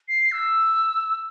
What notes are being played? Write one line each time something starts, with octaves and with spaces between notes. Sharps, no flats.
C7
E6